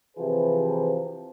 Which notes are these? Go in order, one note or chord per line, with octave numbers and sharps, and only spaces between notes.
C3 E3 F3 G#4 B4